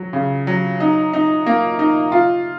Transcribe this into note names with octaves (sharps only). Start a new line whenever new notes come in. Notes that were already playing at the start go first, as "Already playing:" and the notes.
Already playing: F#3
C#3
F#3
D#4
D#4
A#3
D#4
F4